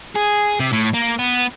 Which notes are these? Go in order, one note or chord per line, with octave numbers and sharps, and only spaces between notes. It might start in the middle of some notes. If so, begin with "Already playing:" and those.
G#4
C3
A2
A#3
B3